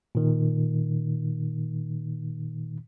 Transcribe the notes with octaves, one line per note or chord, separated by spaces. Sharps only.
A#2 D#3